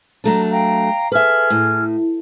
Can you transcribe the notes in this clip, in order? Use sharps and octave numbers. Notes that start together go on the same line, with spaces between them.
F#3 A3 D4 A#5
F5 G5 A#5
G#4 A4 B4 E5 F6
A2